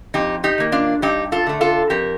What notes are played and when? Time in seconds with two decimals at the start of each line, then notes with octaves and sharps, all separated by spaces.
0.14 F2 D#4 G4
0.44 D#4 G4
0.58 D#3 A#3
0.72 D4 F4
1.02 G2 D#4 G4
1.32 F4 A4
1.47 D3 A3
1.61 F4 A4
1.90 F2 G4 A#4